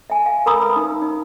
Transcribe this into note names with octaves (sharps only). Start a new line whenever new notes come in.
E5 G#5
F5
A#4 A#5 B5 D#6 E6
B4 B5
D#4
D#4